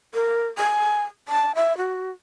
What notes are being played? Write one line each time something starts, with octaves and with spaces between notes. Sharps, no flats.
A#4
G#5
A5
E5
F#4